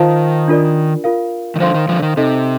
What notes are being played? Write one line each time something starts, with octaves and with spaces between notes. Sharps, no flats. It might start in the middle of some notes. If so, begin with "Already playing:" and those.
Already playing: D#3 F4 C5 F5 A5
D4 F4 A#4 D5
F4 A#4 F5
D#3
D3 F3 C5 F5 C6
D#3
D3 F3
D#3
C3 D#4 A4 D#5